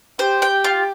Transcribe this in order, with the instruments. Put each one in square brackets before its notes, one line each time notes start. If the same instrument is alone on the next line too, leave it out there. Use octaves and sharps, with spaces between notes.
[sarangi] G4 [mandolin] C5
[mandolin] G5
F4